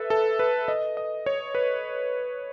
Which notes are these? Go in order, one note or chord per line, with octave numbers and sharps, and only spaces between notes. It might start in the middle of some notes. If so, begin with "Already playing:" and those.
Already playing: A4 B4 E5
A4
B4
D#5
D#5
C#5
B4